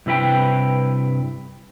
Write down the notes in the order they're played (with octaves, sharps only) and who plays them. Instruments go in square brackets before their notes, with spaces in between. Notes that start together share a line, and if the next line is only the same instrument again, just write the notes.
[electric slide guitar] G2 C3 E4 B4 G5